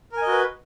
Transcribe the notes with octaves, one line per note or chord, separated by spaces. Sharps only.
F#4 A#4 B4 D#5 G#5